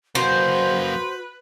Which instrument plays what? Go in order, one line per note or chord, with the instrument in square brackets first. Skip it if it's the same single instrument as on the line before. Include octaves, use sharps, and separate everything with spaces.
[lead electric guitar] F#2 A#3 [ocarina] F#4 [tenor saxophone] B4 [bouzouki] C5